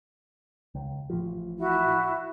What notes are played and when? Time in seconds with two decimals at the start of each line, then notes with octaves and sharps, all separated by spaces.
0.75 C#2
1.10 A1 F3
1.58 E4 F#4